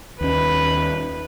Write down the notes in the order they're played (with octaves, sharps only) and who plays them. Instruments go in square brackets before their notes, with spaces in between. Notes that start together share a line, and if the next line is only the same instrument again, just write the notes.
[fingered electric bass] D#2 C#4 [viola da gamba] B4